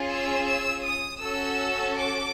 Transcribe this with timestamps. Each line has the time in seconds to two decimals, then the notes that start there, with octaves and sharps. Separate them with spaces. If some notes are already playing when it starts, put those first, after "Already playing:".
Already playing: C#4 F4 G#4
0.09 E6
0.47 E6
0.83 D#6
1.21 C#4 F#4 A4 E6
1.97 D6